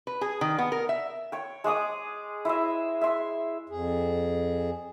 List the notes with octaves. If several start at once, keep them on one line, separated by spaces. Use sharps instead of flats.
B4
G#4
D#3
B3
A#4
E5
C#5 G5
G#3 G#4 D6 D#6
E4 C5 D#5 E5
E5 C6
F2 G#4